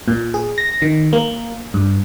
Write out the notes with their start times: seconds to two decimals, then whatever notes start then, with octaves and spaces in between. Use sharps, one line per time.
0.08 A#2
0.34 G#4
0.58 A#6
0.82 D#3
1.13 A#3
1.74 G2